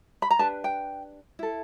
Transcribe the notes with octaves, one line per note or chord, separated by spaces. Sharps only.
B5
A#5
D4 G4 B4 A5
G5
E4 A4